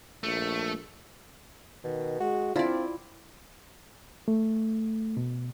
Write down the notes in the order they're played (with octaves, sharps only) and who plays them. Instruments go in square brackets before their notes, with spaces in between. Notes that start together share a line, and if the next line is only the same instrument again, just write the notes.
[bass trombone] A#1 [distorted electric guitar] A3
[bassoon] B2 [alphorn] D#3
[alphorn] G#3 [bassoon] F#4
[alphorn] C4 [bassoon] D4 [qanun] E4 D5 [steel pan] F4
[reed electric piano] A3
B2